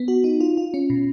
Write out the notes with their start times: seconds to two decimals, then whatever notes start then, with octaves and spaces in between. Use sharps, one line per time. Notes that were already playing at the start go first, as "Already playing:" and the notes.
Already playing: B3
0.08 F#4
0.24 D#4
0.40 F4
0.57 F4
0.74 C#4
0.90 B2